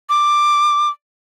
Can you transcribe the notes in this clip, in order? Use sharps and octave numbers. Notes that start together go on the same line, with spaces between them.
D6